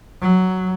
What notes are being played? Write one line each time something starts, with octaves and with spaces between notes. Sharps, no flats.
F#3